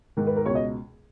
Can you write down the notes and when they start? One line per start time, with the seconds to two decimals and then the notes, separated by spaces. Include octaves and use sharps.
0.17 G#2 D#3
0.27 B4
0.36 A#4
0.46 C#2 B2 C#5
0.55 D#5